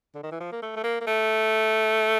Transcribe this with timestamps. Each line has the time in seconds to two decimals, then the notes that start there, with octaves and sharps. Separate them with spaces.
0.15 D3
0.23 D#3
0.31 E3
0.40 F3
0.52 A#3
0.62 A3
0.76 A3
0.84 A#3
1.01 A#3
1.07 A3